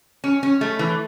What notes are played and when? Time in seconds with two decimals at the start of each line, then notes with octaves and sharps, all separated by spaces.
0.24 C#4
0.43 C#4
0.61 A3
0.79 E3